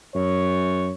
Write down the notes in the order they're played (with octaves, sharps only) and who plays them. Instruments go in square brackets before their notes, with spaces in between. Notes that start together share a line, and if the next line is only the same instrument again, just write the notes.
[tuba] F#2 [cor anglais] C#5